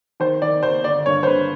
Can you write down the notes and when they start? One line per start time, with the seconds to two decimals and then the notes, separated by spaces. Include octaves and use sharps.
0.20 D#3 C5
0.42 D#3 D5
0.63 D#2 C5
0.84 G1 D5
1.06 G2 C#5
1.23 C5
1.27 D3 B4